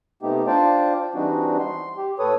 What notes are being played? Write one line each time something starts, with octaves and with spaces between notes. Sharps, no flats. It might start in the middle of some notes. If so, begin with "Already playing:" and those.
C3 A3 B3 D#4 G4
D4 F4 C5 D5 G5 A5
E3 G3 C4 D4 D#4 F#4
C6
G4
A2 A4 B4 C#5 D#6